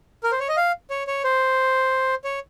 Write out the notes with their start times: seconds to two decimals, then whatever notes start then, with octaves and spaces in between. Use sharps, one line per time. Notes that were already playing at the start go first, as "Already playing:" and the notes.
0.23 A#4
0.32 C5
0.40 C#5
0.49 D#5
0.57 F5
0.90 C#5
1.07 C#5
1.24 C5
2.24 C#5